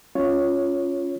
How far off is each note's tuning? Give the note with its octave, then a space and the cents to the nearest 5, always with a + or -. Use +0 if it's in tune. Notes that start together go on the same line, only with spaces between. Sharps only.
C#4 +0 F4 +0 C#5 +0